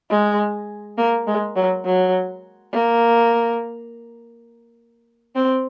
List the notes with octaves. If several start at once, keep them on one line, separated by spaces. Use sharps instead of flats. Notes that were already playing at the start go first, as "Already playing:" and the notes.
G#3
A#3
G#3
F#3
F#3
A#3
C4